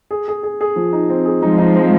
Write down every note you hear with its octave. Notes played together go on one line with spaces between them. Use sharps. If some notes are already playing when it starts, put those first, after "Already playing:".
G#4
G#4
G#4
G#4
F3
D#4
C4
G#4
F3 G#3 D#4
D#4
C4